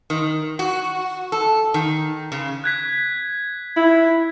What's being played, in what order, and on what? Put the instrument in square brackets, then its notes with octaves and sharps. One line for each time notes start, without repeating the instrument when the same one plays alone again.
[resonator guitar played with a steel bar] D#3
F#4
A4
D#3
C#3
[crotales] F#6 G#6 B6
[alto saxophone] E4